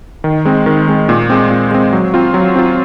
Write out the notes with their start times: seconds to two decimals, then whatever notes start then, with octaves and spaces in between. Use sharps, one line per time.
0.24 D#3
0.45 G#3 C4
0.66 D#3
0.88 G#3 C4
1.09 A#2
1.30 G#3 C4
1.50 A#2
1.71 G#3 C4
1.93 F#3
2.14 C4 F4
2.34 F#3
2.56 C4 F4